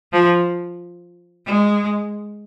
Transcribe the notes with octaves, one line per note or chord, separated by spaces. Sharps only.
F3
G#3